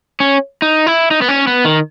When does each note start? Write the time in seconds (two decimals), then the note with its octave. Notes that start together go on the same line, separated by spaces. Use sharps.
0.20 C#4
0.62 D#4
0.87 E4
1.11 D#4
1.22 B3
1.29 C#4
1.47 B3
1.65 D#3